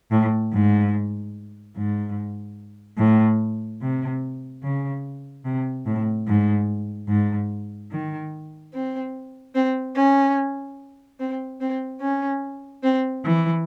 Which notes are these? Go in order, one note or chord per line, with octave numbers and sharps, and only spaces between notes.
A2
G#2
G#2
A2
C3
C#3
C3
A2
G#2
G#2
D#3
C4
C4
C#4
C4
C4
C#4
C4
E3